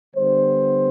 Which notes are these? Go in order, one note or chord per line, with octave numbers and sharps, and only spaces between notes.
D3 G3 B3 C5